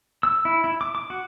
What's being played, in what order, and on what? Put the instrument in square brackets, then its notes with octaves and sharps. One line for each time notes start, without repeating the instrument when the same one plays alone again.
[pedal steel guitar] E6
E4
E4
D6
D6
F#4